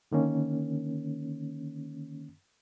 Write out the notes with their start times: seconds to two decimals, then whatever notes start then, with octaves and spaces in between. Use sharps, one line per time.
0.12 D3 D#3 A#3 C#4